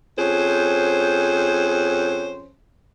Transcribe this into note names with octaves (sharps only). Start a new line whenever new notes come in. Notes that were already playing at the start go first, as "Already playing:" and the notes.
F2 C#4 G#4 C5